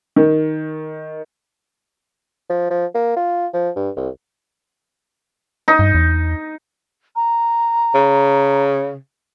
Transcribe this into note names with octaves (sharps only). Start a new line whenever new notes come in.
D#3
F3
F3
A#3
F4
F3
G2
C2
D#4
G2
E2
A#5
C#3